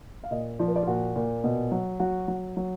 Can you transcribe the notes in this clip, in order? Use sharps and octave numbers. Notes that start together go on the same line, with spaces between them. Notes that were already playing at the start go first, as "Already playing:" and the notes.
F5
A#2 D#5
F3 D5
B4
D5
F4
A#2 F#4
A#2
B2
F#3
F#3 F#4
F#3
F#3